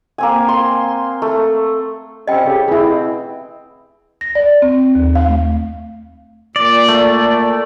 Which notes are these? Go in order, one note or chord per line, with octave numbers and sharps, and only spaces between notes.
A#3 C4 G#5
C6
A3
G3 C4 C#4 D#5 G5
A2 C#3 G4
B2 C4 E4 G#4
A#6
D5
C4
D#2
F5
A3
A#2 D5
A3